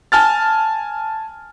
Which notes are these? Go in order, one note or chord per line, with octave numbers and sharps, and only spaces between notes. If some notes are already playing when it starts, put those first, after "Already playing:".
G#5 A5 F6 A6